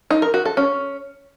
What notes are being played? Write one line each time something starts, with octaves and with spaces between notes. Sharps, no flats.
D#4
A#4
F#4
A4
C#4